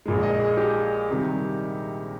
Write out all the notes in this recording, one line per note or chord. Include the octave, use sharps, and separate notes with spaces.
A#1 A#2 G#3
D#5
G#4
G4
C3 D#3 G3